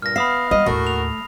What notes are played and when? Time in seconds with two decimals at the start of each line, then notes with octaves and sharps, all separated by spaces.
0.02 G2 A#2 F6 A#6
0.16 B3 E5 F5 B5 D#6 C7
0.51 G3 F4 D#5
0.66 D#2 A2 A3 F#4 A#4
0.87 F7